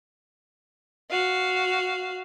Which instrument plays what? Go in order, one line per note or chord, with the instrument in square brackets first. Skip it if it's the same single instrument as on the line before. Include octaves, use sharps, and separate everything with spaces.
[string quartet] F#4 F5